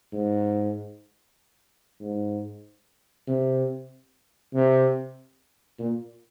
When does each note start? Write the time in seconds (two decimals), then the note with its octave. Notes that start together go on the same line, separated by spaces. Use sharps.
0.13 G#2
2.01 G#2
3.27 C3
4.54 C3
5.78 A#2